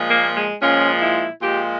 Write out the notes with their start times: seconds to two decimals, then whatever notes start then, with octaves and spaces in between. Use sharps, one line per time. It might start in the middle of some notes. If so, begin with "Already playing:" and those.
Already playing: A#2 F3 G#3
0.09 A#3
0.36 G#3
0.62 A#2 F3 G#3 C#4
1.02 E4
1.42 A#2 F3 G#3 G4